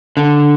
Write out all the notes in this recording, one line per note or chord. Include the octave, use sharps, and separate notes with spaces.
D3